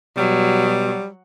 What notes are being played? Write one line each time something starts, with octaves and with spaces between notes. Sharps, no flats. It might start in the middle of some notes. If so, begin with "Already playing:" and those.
B2 F#3 G3